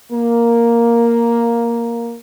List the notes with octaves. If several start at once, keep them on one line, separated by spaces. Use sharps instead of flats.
A#3